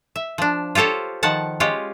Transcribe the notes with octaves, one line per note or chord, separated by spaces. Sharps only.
E5
F3 D4
F4 G4 A4 C5 C#5
D#3 F3 F#5 A5
G#3 C#4 F4 G4